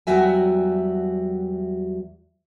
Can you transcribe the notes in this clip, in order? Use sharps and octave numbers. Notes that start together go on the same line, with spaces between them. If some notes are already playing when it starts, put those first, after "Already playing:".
E2 F#3 G3 F#4 E5 G#5